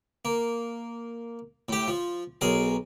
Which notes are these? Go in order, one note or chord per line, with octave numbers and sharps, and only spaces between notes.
A#3
A2 G4
F3
B1 G#4 A#4